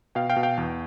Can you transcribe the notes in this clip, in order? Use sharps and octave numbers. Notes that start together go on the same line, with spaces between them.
B2 F5 G5
F5 G5
B2
F5 G5
E2